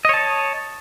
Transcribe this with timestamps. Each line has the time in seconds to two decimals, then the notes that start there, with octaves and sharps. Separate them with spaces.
0.05 D#5
0.09 C#5
0.14 A5